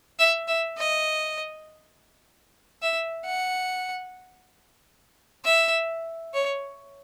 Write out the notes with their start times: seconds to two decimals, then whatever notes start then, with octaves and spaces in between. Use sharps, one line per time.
0.19 E5
0.48 E5
0.77 D#5
2.82 E5
3.25 F#5
5.45 E5
6.34 C#5